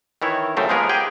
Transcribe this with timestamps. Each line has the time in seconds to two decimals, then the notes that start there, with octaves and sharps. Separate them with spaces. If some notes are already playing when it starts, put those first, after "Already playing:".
0.22 D#3 E3 E4 C#5
0.57 F#2 C#3 A3 C5 G5 A#5
0.69 F3 G#3 A#3 B3 G#4 A#4
0.89 G4 G#4 G5 G#5